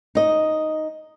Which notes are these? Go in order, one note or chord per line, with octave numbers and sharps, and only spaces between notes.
D#4 D#5